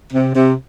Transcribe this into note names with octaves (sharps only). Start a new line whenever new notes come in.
C3
C3